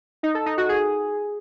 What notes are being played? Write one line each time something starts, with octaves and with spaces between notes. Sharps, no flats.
D#4
A4
D#4
F#4
G#4